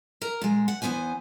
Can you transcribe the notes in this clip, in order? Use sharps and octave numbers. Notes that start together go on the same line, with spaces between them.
A#4 A#5
A#2 G#3
F#5
E2 D#3 B3 C5 G#5